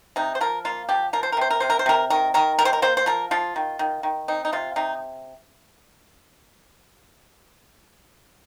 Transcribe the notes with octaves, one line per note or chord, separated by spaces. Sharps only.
C3 D#4
C5
F3 A#4
A#3 F4
F3 G4
F3 A#4
C5
A#4
C3 C5
A#4
C3 C5
A#4
C5
C3 A#4
D#3 A#4
D#3 A#4
G3 A#4
C5
A#4
A#3 C5
C5
F3 A#4
F3 F4
D#3
D#3
D#3
C4 D#4
D#4
C3 F4
C3 D#4